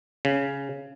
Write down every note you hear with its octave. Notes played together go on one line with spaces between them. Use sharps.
C#3